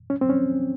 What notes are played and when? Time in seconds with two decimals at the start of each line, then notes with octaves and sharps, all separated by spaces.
0.10 C#4
0.21 C4
0.29 C#4